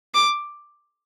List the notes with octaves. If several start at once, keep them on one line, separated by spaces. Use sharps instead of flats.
D6